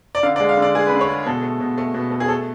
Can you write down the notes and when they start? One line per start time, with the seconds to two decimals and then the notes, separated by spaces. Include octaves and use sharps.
0.15 D5
0.23 D3 F5
0.36 D5
0.40 G#3
0.49 F5
0.57 D3
0.62 D5
0.75 G#3 G#4
0.87 B4
0.92 D3
1.01 C#5
1.08 G#3
1.26 B2 A4
1.43 A3
1.60 B2
1.78 A3
1.94 B2
2.11 A3
2.20 G#4
2.28 A3 A4